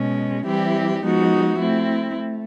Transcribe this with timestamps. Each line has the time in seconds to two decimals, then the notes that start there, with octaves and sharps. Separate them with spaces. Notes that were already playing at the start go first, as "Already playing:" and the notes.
Already playing: B2 G#3 C#4
0.46 E3 G3 C4 E4 G4
1.03 F3 G#3 B3 D#4 F#4
1.59 A3 C4 E4
2.14 A3